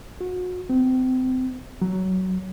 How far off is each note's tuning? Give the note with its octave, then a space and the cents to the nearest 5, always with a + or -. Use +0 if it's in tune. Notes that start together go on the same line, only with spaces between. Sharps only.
F#4 -30
C4 -30
F#3 +15